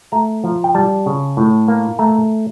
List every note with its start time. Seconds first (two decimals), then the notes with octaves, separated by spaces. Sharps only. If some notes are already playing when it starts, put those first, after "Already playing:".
0.12 A3 A#5
0.44 F3
0.64 G5
0.75 G3 A5
1.06 C#3
1.37 A2
1.68 A#3
1.99 A3 A#5